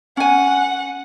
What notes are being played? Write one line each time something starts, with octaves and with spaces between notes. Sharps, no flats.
C#4 F#5 G#5